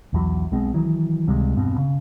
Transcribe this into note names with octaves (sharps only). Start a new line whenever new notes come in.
B1 E2 F#3
B1 B2 G#3 C4
D#3 E3 F#3
C#2 C3 G3 G#3
E1 G2 B2 C4
C#3